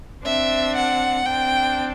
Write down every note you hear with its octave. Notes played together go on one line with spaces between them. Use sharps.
C4 D4 E5
F#5
C4 D4 G5